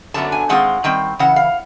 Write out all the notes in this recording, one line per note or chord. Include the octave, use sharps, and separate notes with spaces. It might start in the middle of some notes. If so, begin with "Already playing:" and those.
F#2 D3 F#3 B3 A5
G#5
D#3 G#3 C4 F4 F#5
D#3 G3 C4 G5
C#3 E3 F#5
F5